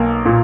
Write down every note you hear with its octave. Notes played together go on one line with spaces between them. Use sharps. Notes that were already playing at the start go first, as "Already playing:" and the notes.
Already playing: B1 A#3
A#2